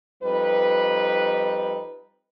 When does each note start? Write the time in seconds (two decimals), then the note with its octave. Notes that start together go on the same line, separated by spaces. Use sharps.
0.22 F2 G3 D#4 B4